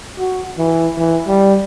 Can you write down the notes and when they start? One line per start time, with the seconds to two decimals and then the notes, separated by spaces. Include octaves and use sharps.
0.19 F#4
0.58 E3
0.97 E3
1.27 G3